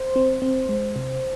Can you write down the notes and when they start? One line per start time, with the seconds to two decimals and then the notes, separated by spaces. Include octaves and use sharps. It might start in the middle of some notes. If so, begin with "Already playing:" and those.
Already playing: C5
0.16 C4
0.42 C4
0.69 G#3
0.96 C3